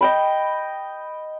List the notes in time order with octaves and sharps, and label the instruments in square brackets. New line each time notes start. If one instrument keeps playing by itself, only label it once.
[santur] D#5 G5 B5